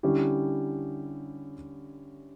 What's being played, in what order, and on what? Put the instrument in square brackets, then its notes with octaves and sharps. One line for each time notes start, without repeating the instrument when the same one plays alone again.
[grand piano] D3 G3 C#4 E4 G4